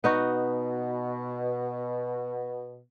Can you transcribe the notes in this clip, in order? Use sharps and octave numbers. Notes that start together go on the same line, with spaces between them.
B2 B3 D#4 F#4